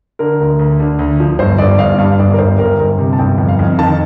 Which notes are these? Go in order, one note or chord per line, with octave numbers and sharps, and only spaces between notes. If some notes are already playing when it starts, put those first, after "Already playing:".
D3 A#4
D2
D2
D3
D2
F3
G1 C5
G1 D5
G1 F5
G2 F5
G1 D5
A#4
G1 C5
G1 A#4
G1
C3
A5
G1 G5
F2
F5
F2
D#3 A5